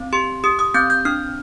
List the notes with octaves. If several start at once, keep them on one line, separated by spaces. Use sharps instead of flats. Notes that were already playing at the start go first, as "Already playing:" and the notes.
Already playing: C4
G4 C6
G4 D#6
D#6
C4 G6
G6
D4 F6